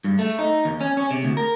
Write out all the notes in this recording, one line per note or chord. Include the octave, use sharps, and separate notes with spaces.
G2
A3
D#4
D#2
C#4
C#4
C3
D2
A#4